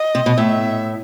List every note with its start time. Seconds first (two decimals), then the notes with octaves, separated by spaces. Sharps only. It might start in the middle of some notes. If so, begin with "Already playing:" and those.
Already playing: D#5
0.15 C3
0.26 B2
0.38 A2 E5